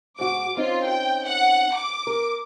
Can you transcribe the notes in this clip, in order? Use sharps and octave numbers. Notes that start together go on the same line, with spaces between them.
G#2 F#4 D6
C4 C#4 D#4 F4
G5
F#5
D6
A#4